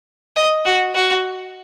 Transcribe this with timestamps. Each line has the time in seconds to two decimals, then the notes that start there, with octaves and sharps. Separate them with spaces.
0.36 D#5
0.65 F#4
0.94 F#4